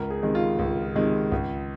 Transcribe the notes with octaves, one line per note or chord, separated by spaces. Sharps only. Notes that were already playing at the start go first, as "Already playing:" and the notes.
Already playing: C#2 A#4
G#4
C3 D#3 G#3
F4
C#2
C3 D#3 G#3
C#2